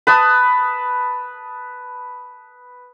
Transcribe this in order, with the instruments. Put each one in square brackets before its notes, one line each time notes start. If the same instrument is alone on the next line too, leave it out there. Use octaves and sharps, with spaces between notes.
[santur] B4 A5 D#6